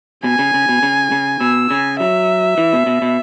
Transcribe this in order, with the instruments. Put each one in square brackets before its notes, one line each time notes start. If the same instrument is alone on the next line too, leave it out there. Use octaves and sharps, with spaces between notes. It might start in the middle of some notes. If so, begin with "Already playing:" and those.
[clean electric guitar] B2 [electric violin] G#5
[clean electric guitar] C#3
C#3
B2
C#3
C#3
[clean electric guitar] B2 [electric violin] E6
[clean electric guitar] C#3 [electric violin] G#5
[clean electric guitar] F#3 [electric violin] E5
[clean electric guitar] E3
B2
B2
B2